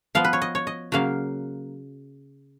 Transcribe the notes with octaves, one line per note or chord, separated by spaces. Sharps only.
F3 B3 F5
B4
C#5
D#5
C#5
D#5
C#3 F#3 A#3 F5